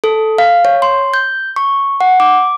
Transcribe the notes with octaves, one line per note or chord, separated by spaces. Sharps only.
A4
F5
C#5
C6
G6
C#6
F#5
D6